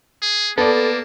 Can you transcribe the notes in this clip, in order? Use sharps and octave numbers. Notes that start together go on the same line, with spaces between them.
G#4
A#3 B3 A4 D5